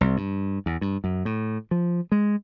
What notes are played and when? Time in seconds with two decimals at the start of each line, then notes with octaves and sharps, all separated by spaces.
0.01 C2
0.17 G2
0.66 E2
0.81 G2
1.04 F#2
1.25 A2
1.71 F3
2.12 G#3